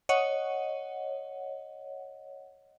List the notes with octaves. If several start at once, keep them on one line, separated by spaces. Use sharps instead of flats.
C#5 D#5 F#5